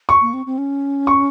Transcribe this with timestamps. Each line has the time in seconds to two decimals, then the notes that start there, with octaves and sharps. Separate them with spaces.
0.09 C#6
0.21 A#3
0.33 C4
0.46 C4
0.58 C#4
1.07 C#6